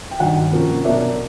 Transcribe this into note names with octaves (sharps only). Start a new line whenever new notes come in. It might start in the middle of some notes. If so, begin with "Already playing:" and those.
G5
G2 D#3 F#3 F#5
C3 F3 A#3 C#4
B2 F#3 A#3 D4 E5